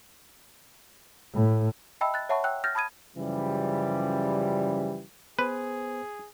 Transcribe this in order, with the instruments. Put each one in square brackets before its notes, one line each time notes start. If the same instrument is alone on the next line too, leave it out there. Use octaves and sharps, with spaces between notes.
[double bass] A2
[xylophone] D#5 E5 G5 A5 B5 E6
F#6 A6
C#5 E5 F#5 A5 B5 C#6
G5 E6 F#6
F6 G6 A6 A#6
A5 B5 D#6 G#6 D#7
[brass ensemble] F#2 C#3 E3 F3 G3
[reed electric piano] B3 C5 [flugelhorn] G#4 [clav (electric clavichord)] B4